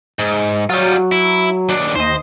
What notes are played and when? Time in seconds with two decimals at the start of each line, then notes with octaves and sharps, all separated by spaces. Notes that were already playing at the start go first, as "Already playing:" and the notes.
0.19 G#2
0.69 F#3 G3 F4
1.12 E4
1.69 D#2 D4
1.95 D#2 C5 D#5